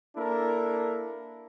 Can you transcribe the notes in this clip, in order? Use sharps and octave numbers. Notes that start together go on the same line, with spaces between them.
A#3 D4 E4 A4 A#4